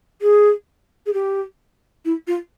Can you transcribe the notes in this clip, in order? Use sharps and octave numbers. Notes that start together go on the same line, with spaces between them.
G#4
G#4
G4
E4
F4